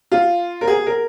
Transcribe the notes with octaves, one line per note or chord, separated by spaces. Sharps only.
F4
A#4
G#4
A#4